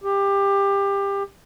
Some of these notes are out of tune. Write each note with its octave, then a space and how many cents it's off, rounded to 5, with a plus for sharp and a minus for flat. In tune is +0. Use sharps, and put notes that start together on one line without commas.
G4 +20